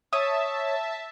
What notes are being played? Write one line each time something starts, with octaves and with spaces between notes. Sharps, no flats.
C#5 E5 A5 D#6